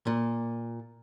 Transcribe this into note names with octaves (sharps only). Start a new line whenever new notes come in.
A#2